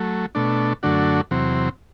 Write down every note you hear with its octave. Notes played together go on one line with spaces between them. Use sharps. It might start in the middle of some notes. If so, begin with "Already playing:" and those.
Already playing: F#3 A3
B2 A3 D4
F#2 D3 A3 D4 F#4
E2 C3 F#3 C4